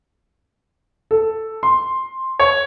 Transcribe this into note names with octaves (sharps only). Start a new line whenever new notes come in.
A4
C6
C#5